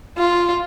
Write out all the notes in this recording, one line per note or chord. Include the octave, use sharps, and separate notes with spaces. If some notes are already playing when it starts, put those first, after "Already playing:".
F4